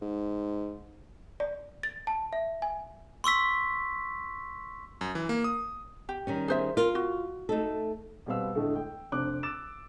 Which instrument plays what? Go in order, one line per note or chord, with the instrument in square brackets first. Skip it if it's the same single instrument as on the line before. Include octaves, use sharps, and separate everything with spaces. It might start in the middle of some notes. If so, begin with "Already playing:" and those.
[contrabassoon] G#2
[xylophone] D5
A6
A5
E5
G#5
[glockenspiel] C6 C#6 E6 B6
[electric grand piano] F#2
E3
A#3
D#6
[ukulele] G4
[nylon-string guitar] D#3 G3 C#4
[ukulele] G#4 C5 E5
[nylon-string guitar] F4 [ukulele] A#4
[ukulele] F#4
[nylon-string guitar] A3 D#4 A4
[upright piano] B2 G3 C4 B4 F5 E6
A2 D3 G#3 A3
G5
F1 C4 D4 D6 F#6
D6 E6 F#6 A6 E7